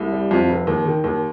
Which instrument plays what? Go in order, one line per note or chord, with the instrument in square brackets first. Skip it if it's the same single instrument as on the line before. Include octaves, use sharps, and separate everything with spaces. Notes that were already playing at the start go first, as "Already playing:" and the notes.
Already playing: [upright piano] C2
G3
F2
F1
D#2
D#3
D#2